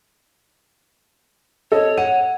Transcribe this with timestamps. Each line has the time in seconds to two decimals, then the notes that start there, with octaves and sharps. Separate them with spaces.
1.72 A4 C#5 D#5
1.98 F#5 D#7